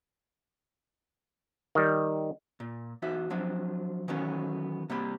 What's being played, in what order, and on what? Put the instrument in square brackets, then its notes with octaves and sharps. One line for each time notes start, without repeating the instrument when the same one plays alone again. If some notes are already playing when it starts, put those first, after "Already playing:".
[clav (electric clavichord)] D#3 G3
[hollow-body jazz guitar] A#2
E2 D#4 F#4 E5
F3 F#3 C4 D4
D#3 E3 F#3 A3 B3 C#4
C3 G3 A#3 C4 B5